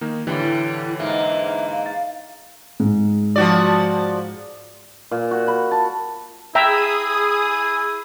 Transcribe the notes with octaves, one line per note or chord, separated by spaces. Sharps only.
D#3 A#3 D#4
A2 D3 E3 G3 E4
G#2 A#3 E5
F5
A6
G#2
F3 F#4 D5
A#2
F#4
B5
A5
E4 G#4 E5 G5 A#5 D#6